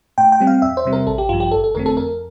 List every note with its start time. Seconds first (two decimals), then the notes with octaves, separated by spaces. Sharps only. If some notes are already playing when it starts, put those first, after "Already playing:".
0.18 A2 G5
0.32 G5
0.40 G3 C4
0.47 F5
0.62 E2 E5
0.77 C5
0.85 C3 G3 C4
0.93 A#4
1.07 A1 A4
1.18 G4
1.29 G2 F3 F4
1.40 G4
1.51 G1 A4
1.64 A4
1.74 F2 D3 A3 C4 A#4
1.86 A4
1.97 F2 A#4